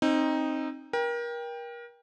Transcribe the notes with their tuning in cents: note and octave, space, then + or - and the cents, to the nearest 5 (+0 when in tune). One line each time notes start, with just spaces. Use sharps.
C4 +25 D#4 +0
A#4 +30 G5 +15